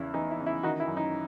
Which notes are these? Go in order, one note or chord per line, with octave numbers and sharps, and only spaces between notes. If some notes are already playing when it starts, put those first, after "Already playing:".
Already playing: E2 C#3 E4
E3 D#4
E4
C#3
E4
D#3 D#4 F#4
E4
F#2
D#4